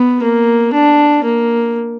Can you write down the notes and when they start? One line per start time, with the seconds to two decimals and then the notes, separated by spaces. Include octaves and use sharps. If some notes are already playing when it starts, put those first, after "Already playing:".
Already playing: B3
0.23 A#3
0.73 D4
1.24 A#3